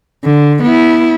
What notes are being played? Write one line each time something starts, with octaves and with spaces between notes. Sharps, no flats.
D3
B3 E4